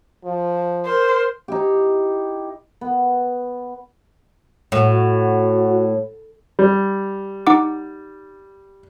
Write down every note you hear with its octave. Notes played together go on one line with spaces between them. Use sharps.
F3
A#4 C5
D#4 E4 G4
B3
A2 F#4
G3
D#4 F#5 D6